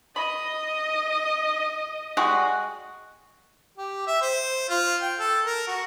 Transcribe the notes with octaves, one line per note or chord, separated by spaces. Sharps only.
D#5 B5
G3 G#3 F#4
G4
E5
C5
F4
G5
A4
A#4
F#4